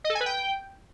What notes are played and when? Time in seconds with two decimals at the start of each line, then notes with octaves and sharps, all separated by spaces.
0.04 D#5
0.10 A4
0.15 G#5
0.20 B4
0.26 G5